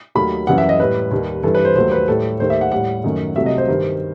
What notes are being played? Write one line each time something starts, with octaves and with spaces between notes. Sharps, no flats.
D#2 D#3 F#3 A3 B5
F#2 E3 G3 F#5
E5
D#5
A2 G3 B4
D#2 D#3 G3
G2 E3 G3 A4
B4
C5
D#2 D#3 F#3 A3 C5
B4
A2 G3 A4
D#2 D#3 A3 C5
E5
F#5
A2 G3 F#5
F#2 D#3 A3
C2 C3 F#3 A3 E5
D#5
C5
G2 D#3 G3